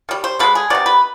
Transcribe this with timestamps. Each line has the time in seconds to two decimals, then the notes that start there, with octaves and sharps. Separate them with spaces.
0.09 D#3 G3
0.24 C5
0.39 D3 F3 G#3 B4
0.55 G#4
0.70 C3 D#3 B3 D5
0.86 B4